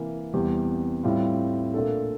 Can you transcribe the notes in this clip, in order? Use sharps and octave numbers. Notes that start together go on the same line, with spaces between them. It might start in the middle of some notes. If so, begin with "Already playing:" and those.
Already playing: C3 E3 A#3
E2 C3 G3 C4 G4
A2 G3 C4 F4
A#2 A3 D4 A4